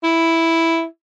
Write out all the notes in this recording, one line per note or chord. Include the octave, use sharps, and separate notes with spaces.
E4